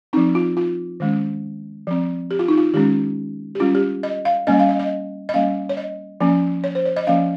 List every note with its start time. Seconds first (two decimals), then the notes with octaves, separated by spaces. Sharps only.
0.13 F3 C4 D#4
0.35 F4
0.57 F4
1.00 D#3 G#3 C#4
1.87 F3 C4
2.31 G4
2.39 F4
2.48 D#4
2.58 F4
2.73 D#3 G#3 C#4 G4
3.55 G4
3.60 G3 C#4 F4
3.75 G4
4.03 D#5
4.25 F5
4.47 G3 A#3 C#4 D#5
4.59 F5
4.69 D#5
4.79 D#5
5.29 D#5
5.34 G3 A#3 C#4 F5
5.69 C#5
5.77 D#5
6.20 F3 A#3 C#4
6.64 C#5
6.75 C5
6.85 C#5
6.96 D#5
7.07 F3 A#3 C#4 F5